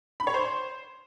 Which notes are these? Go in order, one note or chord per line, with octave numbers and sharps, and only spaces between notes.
B5
C#5
C5